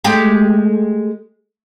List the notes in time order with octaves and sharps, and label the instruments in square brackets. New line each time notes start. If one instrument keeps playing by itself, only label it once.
[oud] G#3 A3 G4